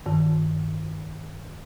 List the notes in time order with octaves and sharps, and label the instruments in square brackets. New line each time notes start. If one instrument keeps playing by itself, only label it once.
[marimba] G2 D#3